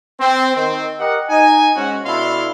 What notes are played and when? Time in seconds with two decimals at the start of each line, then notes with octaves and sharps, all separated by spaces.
0.20 C4
0.55 D#3 C4
1.00 G4 A#4 D#5 F#5
1.29 D#4 G#5
1.76 G#2 C#4 F#4
2.05 B2 D4 E4 A4 F5 C6